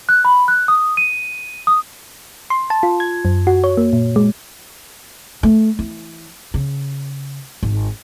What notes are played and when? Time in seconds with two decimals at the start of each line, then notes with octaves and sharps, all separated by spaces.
0.09 F#6
0.25 B5
0.48 F#6
0.68 D#6
0.97 D#7
1.67 D#6
2.50 C6
2.70 A5
2.83 F4
3.00 G#6
3.25 F#2
3.47 F#4
3.64 C#5
3.77 A#3
3.93 A#2
4.16 G#3
5.43 A3
5.79 E3
6.54 C#3
7.63 G#1